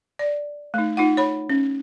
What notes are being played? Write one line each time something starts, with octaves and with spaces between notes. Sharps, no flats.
D5
A3 D#4
D#4 F4 F#5
C#5 B5
C#4